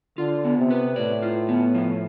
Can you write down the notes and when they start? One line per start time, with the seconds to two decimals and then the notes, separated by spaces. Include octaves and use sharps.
0.18 D3 F4
0.44 B3
0.58 C3
0.70 B4
0.96 A2 D5
1.22 F4
1.49 B3
1.75 F3